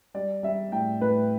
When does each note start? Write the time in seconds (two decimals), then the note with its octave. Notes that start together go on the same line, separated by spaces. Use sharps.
0.14 G3 D5
0.43 G3 E5
0.72 A2 G5
1.01 A2 B4